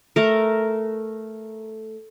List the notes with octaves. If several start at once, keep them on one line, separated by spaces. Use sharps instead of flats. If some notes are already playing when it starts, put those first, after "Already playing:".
A3 A#4